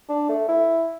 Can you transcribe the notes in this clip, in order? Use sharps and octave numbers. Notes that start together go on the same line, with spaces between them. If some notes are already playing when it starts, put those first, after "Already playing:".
D4
A3
E4